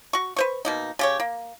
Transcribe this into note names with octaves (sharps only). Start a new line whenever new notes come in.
F#4 C#6
B4 C5 C#6
B2 A#3 D#4
C#3 G4 C#5
A#3